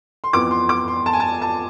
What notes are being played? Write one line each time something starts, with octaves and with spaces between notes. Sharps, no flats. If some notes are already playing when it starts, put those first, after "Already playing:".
C6
F2 E3 B3 D6
C6
D6
C6
A5
G#5
A5
A5